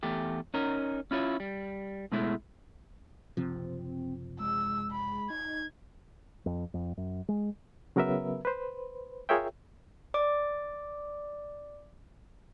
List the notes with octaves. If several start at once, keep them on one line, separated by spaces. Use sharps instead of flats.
E2 A3 G4
C#4 D#4 A#4
C#4 E4 F4 C#5
G3
B2 G#3 A3 E4
F#1 C3 F3 C4
G#3 E6
B5
D#4 G#6
F2
F2
F#2
G#3
C#3 F#3 B3 A#4 B4 E5
B4 C5
F4 G#4 A#4 C#5 E5 G5
D5 D6